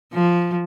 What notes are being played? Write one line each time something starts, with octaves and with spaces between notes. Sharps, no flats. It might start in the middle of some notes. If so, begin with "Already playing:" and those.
F3